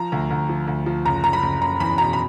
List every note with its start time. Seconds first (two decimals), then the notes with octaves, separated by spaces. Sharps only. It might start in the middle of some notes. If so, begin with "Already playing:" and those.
Already playing: F3 A#5
0.12 D2
0.30 D2
0.49 F3
0.67 D2
0.86 F3
1.05 F#1 A#5
1.24 F#1 A#5
1.33 B5
1.42 F#1
1.61 F#1 A#5
1.80 E2 B5
1.98 B2 A#5
2.13 B5